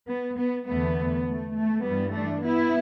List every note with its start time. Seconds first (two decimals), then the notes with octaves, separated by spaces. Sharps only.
0.09 B3
0.38 B3
0.68 E2 D3 A3 B3
1.27 A3
1.56 A3
1.85 G2 E3 G3 B3
2.14 A3 D4
2.44 B3 E4